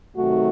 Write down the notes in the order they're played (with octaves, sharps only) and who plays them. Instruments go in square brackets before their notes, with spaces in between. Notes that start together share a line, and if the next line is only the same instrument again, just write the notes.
[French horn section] C3 D#3 F#3 A3 F#4